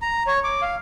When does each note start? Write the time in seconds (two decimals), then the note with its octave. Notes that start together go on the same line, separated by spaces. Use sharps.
0.02 A#5
0.27 C#5
0.44 D6
0.62 F5